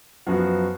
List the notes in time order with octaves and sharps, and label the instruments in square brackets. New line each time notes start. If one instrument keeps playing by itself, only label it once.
[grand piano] F#2 F3 B3 F#4